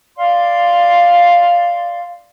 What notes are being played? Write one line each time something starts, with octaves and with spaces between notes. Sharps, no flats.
D5 F5 C6